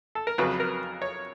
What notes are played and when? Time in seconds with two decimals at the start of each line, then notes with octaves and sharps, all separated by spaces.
0.15 A4
0.27 A#4
0.38 F2 C#3 F#3 B4
0.60 A#4
1.02 C#5